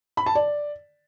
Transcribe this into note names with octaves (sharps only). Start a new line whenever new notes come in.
B5
A5
D5